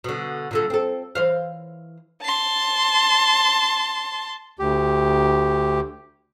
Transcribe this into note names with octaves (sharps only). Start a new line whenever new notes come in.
B2 D3
A#2 D3 A4
C4 A4
E3 C5 F5
A5 C6
D2 G4